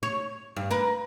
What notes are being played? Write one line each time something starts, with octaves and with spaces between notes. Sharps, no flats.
C#5
G2
A#4 B4